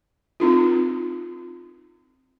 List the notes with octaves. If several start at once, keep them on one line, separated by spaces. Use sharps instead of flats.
C4 D#4 F4